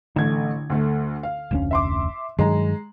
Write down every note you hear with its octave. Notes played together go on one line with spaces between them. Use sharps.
A1 D3 A3 G#6
D2 A3
F5
F1 D2 C#4
E5 C6 D6
G2 D#3 F#3 G#3 A#5